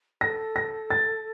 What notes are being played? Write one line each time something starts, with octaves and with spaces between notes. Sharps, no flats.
A4 A#6
A#6
A6